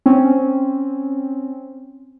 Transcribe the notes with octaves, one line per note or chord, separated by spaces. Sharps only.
C4 C#4